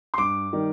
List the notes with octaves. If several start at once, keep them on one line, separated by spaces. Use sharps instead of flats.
C6
G2 D6
D#3 G3